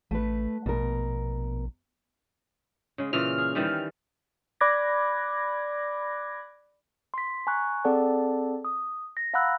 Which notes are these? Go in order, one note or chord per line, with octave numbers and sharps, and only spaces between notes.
A1 A3 B4
A#1 B2 A#4
C#3 G#3
A#2 C#3 E3 F6
G#4
D#3 E3 G3
D5 B5 D6 F#6 G#6 A#6
C6 B6
G#5 A#5 C#6 F#6
C4 G#4 A4 D5 F#5 A5
D#6
A#6
F5 F#5 A#5 B5 E6 F#6